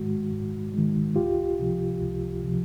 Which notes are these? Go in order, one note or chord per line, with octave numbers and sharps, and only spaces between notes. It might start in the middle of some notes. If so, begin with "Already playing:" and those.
Already playing: G#2 D#3 G#3 F#4
G#2
D#3 G#3
C#2 F4 G4
C3 F3
C#2
C3 F3